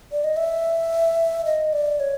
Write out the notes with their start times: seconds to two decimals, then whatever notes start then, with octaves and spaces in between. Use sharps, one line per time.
0.12 D5
0.24 D#5
0.37 E5
1.45 D#5
1.73 D5
2.00 C#5